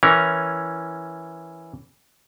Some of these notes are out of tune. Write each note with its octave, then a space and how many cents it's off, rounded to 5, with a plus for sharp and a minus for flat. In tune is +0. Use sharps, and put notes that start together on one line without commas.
E3 +0 C#4 +0 A#4 +0